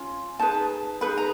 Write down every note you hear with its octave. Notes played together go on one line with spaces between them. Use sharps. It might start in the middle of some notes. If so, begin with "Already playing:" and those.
Already playing: C#4 F4
D#4 G#4 B4 A5
D#4 G#4 B4 B5
A#5